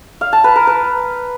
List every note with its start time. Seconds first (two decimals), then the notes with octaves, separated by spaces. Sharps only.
0.21 F5
0.33 A5
0.44 B4
0.56 A#4
0.67 B4